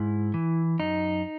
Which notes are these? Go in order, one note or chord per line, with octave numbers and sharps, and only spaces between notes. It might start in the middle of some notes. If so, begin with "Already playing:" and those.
Already playing: G#2 E4
E3
F#2 D#4